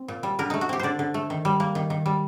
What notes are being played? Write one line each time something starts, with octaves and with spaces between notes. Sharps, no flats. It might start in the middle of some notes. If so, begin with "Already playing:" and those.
Already playing: C4
A#2
G3
D3 A#4
A3 D#4
F#4
C4 G4
D3 C5 D5
D3
A3
D#3
G3
A#3
D#3
D#3
G3